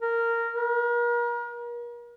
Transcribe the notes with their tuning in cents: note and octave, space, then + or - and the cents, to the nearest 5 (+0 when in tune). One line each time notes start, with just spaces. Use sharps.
A#4 -10
A#4 +40